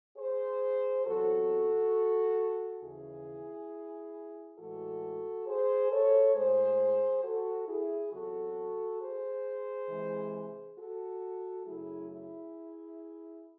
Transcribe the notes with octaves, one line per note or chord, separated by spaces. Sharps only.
G#4 C5
E2 C3 F#3 F#4 A4
D#2 C#3 E3 E4 G#4
A2 E3 G#3 F#4 A4
G#4 C5
A4 C#5
A2 G#3 G#4 C5
F#4 A4
E4 G#4
E2 C3 F#3 F#4 A4
G#4 C5
C3 E3 G#3
F#4 A4
F#2 C#3 F#3 A3 E4 G#4
E4 G#4